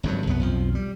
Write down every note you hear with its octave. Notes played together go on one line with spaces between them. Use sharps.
G#1 G2 C#3 F#3
C2 F#2 B3
B1 F2 F3
G3